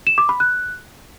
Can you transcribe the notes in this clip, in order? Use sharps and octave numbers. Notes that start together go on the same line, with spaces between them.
E7
D6
B5
F#6